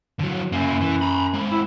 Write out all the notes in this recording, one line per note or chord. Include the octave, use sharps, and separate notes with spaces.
D3 F#3
F#2 A#3 E4
E3
A#5 B5
G#3 F#4
E4